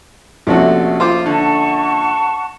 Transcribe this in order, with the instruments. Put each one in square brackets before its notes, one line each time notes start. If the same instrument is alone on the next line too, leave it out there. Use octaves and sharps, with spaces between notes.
[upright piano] A#1 C#4 [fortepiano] C3 A3 F#4
[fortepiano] F4 C5 D6
[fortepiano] D3 [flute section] F#5 A5 C#6